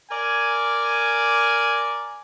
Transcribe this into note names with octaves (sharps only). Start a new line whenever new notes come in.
A#4 D5 G#5